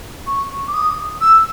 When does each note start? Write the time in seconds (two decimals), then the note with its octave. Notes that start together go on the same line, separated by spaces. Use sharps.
0.27 C#6
0.68 D6
0.74 D#6
1.21 E6